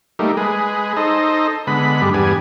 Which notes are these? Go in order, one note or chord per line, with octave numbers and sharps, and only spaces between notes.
G3 A3 A#3 D#4
G#3 G#4 B4
D#4 A4 C5 D#5
D3 G#3 B3 B5
G2 G3 G#3 D4
E2 G2 G3 B3 G#5